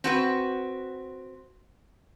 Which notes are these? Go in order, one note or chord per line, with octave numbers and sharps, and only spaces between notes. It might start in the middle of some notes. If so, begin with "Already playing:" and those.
C4 F#4 B4